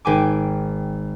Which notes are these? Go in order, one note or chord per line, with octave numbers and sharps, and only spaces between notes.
G#1 G5 G#5 D6